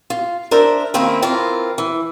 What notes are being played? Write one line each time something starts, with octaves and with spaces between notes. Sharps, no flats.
F4
D4 A#4 C5 E5
D#3 A#3 C4 C#4 E4 F4
E3 C4 F4 A#4
E3